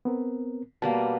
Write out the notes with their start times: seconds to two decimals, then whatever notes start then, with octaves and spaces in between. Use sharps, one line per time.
0.05 B3 C4 A#4
0.82 B2 G3 A#3 A5